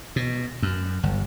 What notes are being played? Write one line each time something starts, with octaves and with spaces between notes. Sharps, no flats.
B2
F#2
G1